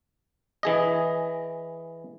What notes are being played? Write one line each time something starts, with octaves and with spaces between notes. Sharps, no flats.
E3 G#4 D#5